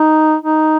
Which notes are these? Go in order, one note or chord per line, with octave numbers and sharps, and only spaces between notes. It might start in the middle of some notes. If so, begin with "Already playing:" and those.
Already playing: D#4
D#4